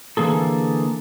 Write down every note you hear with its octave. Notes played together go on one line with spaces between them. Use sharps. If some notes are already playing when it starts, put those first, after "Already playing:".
D3 E3 A#3 G#4 A4